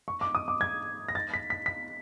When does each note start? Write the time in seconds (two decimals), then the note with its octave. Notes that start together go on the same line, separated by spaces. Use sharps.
0.08 C#6
0.21 D6
0.35 D#6
0.48 D6
0.61 G#6
1.09 A#6
1.15 A6
1.34 B6
1.50 B6
1.66 B6